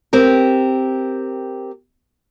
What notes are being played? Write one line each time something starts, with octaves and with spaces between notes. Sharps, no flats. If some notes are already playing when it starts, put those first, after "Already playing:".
C4 G4 A#4